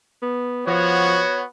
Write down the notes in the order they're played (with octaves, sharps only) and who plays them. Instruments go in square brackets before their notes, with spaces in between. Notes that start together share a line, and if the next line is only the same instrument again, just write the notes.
[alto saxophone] B3
[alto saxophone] F3 [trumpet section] B3 F#4 C#5